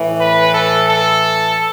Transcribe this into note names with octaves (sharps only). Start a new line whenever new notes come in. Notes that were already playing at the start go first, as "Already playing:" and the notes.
Already playing: A2 E3
B4
A4
A4